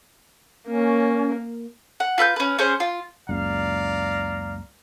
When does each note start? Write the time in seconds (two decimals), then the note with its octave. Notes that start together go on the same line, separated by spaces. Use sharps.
0.67 A#3 C#4
2.00 F#5
2.18 F4 B4 F6 G6
2.36 C#4 B4
2.59 C#4 G#4 C5
2.80 F4
3.29 F#1 C#2 D5 F5 A#5